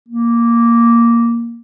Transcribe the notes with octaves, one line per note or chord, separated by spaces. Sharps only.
A#3